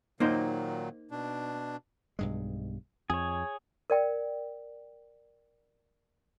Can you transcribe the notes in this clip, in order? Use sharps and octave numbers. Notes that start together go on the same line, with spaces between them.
A#2 D#3 F#3 A#3 D#4 C5
B2 D4
B1 G2 G#3
F2 G#4 C#5
A#4 D5 G5